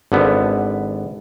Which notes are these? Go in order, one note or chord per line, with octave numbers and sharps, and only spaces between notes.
G#1 D3 B3